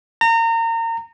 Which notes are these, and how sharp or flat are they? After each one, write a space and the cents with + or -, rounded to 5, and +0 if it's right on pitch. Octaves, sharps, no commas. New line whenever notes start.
A#5 -30